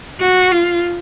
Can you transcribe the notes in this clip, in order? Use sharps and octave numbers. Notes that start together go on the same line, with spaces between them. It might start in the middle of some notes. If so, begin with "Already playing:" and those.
F#4
F4